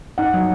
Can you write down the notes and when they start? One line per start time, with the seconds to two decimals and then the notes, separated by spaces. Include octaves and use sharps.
0.18 D#4 F#5
0.34 F#3